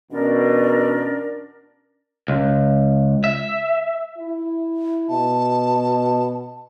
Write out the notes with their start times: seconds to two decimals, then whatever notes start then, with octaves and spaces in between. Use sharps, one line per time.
0.11 E2 B2 C#4 D4 A#4
2.28 C#2
3.24 E5
4.18 E4
5.09 B2 A5